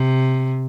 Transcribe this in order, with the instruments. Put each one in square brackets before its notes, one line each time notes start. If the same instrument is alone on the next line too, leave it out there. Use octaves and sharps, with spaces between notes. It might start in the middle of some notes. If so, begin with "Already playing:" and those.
Already playing: [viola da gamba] C3